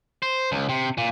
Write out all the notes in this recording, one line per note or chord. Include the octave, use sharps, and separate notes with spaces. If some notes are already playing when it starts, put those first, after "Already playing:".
C5
C#2
C3
A#2